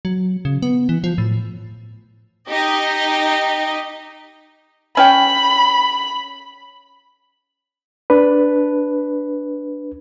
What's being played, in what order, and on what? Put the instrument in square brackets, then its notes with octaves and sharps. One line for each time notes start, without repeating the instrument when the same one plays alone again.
[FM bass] F#3
C#3
B3
E3
F3
A2
[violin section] D#4 G4 D#5
[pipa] C#4 C#5 G5 [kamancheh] B5
[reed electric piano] D4 B4